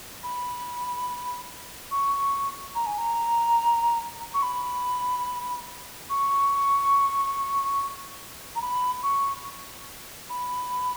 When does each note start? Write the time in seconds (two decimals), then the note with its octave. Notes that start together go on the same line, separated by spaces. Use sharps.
0.23 B5
1.91 C#6
2.75 A#5
2.86 G#5
2.98 A#5
4.34 C#6
4.43 B5
6.10 C#6
8.55 A#5
8.61 B5
9.03 C#6
10.30 B5